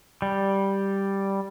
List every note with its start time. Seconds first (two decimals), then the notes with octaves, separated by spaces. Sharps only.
0.22 G3